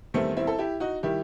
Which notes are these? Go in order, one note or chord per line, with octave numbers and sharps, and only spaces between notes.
E2 D#3 G3 A3 C4
C4 E4
A4
E4 G4
D#4 F#4
D#3 G3 E4 G4